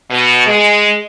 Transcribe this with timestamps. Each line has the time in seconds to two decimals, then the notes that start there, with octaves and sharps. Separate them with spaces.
0.11 B2
0.47 G#3